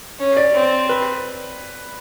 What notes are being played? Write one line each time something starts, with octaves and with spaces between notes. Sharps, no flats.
C#4
D5
C4
B4